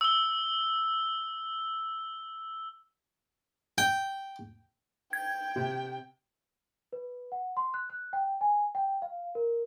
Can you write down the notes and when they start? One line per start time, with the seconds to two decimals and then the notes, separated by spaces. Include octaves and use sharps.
0.01 E6 G7
3.78 G5
5.13 G5 G#6
5.56 C3
6.93 B4
7.32 F#5
7.57 C6
7.74 F#6
7.90 F#6
8.13 G5
8.41 G#5
8.75 G5
9.02 F5
9.35 A#4